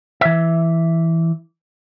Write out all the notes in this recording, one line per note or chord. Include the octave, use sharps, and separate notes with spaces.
E3 E5